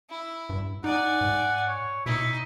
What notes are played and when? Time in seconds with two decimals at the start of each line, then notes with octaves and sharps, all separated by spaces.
0.10 E4
0.49 G2
0.84 D#4 D5 F#5 G#5
1.21 G#2
1.68 C#5
2.06 B2 D#4 E4